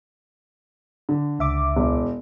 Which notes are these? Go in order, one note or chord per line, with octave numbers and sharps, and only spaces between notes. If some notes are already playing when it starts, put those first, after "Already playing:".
D3
C#2 E5 D6
E1